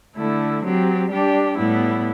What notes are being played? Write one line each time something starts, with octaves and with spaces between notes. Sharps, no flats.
D3 A3 E4
F#3 C4 G4
G3 D4 G4
A2 G3 B3 E4